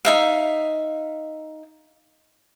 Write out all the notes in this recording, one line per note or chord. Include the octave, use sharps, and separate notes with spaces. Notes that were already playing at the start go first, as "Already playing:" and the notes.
D#4 E5 F5